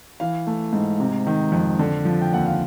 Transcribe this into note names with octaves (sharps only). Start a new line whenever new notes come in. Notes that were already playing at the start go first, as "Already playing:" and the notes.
E3 F5
A3
G#2
C3
D#3
F2
D3
F3
G5
D#2 F#5
F5